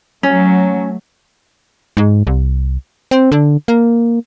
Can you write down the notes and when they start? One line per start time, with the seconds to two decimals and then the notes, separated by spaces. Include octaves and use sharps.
0.23 F#3 A3 C#4
1.97 G#2
2.27 C2
3.11 C4
3.32 D3
3.68 A#3